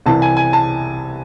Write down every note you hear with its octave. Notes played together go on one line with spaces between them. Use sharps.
C2 C3 E3 A5
G#5
G#5
A5